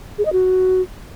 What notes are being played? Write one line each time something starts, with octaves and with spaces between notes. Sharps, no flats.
G#4
D#5
F#4